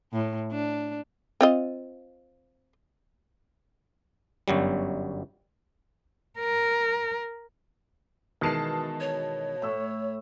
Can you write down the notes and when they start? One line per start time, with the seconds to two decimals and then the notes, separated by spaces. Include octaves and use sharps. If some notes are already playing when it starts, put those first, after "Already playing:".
0.13 A2
0.51 D4
1.41 C4 F4 D#5
4.48 G1 F#2 F#3 G3
6.39 A#4
8.41 B2 D#3 E3 G#3 A5 C7
9.00 C#5
9.62 A2 E5 C#6